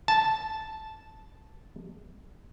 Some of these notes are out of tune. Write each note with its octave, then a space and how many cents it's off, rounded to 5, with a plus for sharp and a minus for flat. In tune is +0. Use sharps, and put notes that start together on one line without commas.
A5 -5